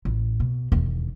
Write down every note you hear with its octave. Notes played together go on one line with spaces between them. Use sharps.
A1
B2
E1 D#2